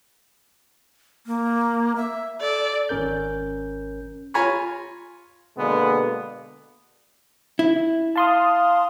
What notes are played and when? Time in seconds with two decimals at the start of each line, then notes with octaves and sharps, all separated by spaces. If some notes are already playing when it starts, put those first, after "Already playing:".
1.27 A#3
1.96 E5
2.41 A4 D5
2.89 G#1 C#4 A#4 G6
4.34 F4 C#5 G#5 A#5 B5 C#6
5.57 B2 D3 G#3 A#3 B3
7.59 E4
8.16 F5 A5 C6 D#6